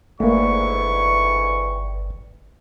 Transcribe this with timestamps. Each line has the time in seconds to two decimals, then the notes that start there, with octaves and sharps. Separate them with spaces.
0.20 G1 G#2 D3 E3 A3 A#3 C#6